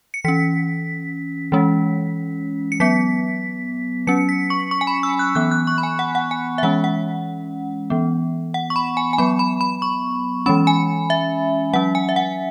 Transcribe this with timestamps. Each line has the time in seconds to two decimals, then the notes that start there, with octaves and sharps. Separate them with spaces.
0.14 C#7
0.25 E3 C#4 B6
1.52 E3 G#3 C#4
2.72 C#7
2.80 F#3 B3 B6
4.07 F#3 C#4 C#7
4.29 B6
4.50 C#6
4.71 C#6
4.81 G#5
4.87 B5
5.03 E6
5.19 F#6
5.35 E3 B3 F#6
5.51 F#6
5.67 C#6
5.78 B5
5.83 G#5
5.99 F#5
6.15 F#5
6.31 G#5
6.58 E5
6.63 E3 G#3 C#4 F#5
6.84 F#5
7.90 E3 B3
8.54 F#5
8.70 C#6
8.76 B5
8.97 G#5
9.13 G#5
9.18 F#3 B3 B5
9.39 B5
9.61 B5
9.82 C#6
10.46 E3 G#3 C#4 B5
10.67 G#5
11.10 E5
11.73 F#3 C#4 F#5
11.95 G#5
12.09 E5
12.16 F#5